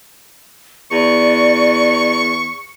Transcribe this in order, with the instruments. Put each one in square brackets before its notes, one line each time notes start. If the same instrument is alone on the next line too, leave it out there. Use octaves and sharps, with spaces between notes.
[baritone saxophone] E2 [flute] D5 [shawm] C#6